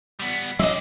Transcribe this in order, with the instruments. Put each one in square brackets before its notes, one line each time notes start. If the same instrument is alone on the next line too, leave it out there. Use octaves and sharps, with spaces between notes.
[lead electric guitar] G3 B3
[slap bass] F#3 [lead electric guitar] G#3 G4 [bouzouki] D#5 E5